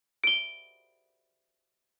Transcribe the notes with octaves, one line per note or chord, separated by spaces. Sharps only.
D7 G7